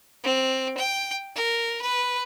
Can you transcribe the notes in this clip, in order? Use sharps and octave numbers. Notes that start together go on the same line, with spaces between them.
C4
G5
A#4
B4